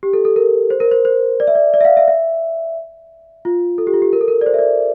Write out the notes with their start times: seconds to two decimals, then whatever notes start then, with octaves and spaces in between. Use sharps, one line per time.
0.03 G4
0.13 A4
0.25 A4
0.36 A#4
0.70 C5
0.80 A#4
0.91 C5
1.05 C5
1.40 D5
1.47 E5
1.55 D5
1.74 D5
1.81 E5
1.85 F5
1.97 E5
2.08 E5
3.45 F4
3.78 A4
3.87 G4
3.94 F4
4.02 G4
4.13 A#4
4.21 A4
4.28 A#4
4.41 D5
4.46 C5
4.54 E5
4.59 D5